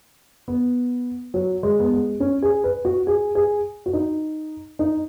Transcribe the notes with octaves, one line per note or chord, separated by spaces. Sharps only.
B3
F#3
G#3
B3
G#3
C#4
G#4
B4
F#4
G#4
G#4
F#4
D#4
D#4